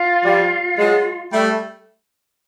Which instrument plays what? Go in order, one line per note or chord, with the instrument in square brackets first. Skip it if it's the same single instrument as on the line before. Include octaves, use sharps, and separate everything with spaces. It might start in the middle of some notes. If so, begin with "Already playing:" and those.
Already playing: [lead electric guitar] F4
[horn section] F3 G3
F#3 G#3
G3 A3